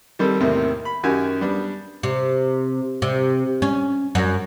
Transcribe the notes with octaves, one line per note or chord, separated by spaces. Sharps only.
D#3 G3 C4 A4
E2 A2 C3 D#3 A#3 C4
B5
F#2 D#3 F#4 G4 G#5
G3 B3 D4
C3
C3
C#4
F#2